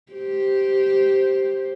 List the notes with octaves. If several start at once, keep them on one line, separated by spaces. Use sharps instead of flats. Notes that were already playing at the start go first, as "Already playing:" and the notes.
G4 C5